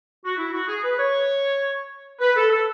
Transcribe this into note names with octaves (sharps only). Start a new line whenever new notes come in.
F#4
E4
F#4
G#4
B4
C#5
B4
A4
A4